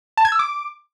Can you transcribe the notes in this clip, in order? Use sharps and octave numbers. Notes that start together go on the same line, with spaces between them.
A5
G#6
E6
D6